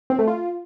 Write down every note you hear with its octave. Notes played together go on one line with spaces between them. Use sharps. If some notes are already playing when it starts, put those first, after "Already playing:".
C4
A3
F4